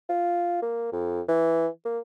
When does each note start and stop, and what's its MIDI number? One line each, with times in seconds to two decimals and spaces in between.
0.09 0.57 65
0.62 0.90 58
0.92 1.21 41
1.29 1.67 52
1.85 1.99 58